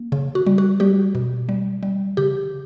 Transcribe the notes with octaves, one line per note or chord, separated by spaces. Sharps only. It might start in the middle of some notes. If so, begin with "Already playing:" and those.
Already playing: A#3
C#3
F#4
G3
F#4
G3 G4
B2
G3
G3
C#3 G4